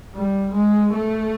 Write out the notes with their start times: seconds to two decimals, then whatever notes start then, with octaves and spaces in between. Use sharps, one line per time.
0.14 G3
0.54 G#3
0.93 A3